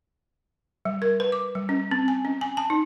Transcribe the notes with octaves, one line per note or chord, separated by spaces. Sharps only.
G3
A#4
B4
D6
G3
C#4
C4
G#5
C#4
G#5
A5
D#4